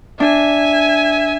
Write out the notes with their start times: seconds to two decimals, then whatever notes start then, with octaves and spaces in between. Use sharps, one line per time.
0.20 D4 E5 G#5